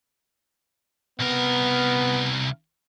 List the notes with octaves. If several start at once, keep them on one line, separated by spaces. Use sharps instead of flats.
C2 B3 A#4